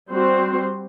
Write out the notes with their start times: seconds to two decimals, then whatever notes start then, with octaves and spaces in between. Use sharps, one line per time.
0.11 G3 C4 F#4 C5